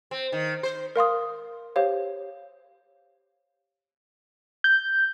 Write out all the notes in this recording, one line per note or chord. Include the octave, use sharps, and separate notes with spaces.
C4
D#3
C5
A#4 F5 C6 D#6
G4 C5 C#5 F5
G6